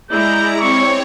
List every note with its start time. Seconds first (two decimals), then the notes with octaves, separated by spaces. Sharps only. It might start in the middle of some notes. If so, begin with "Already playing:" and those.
0.11 G#3 E4 D5 A#5 G6
0.60 C4 C#5 C#6